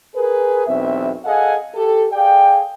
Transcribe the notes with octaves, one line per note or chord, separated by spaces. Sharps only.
G#4 A#4 B4
B1 E2 C4 E5
G#4 A4 D#5 F5 F#5 G#5
G4 A4
G#4 D5 F5 G5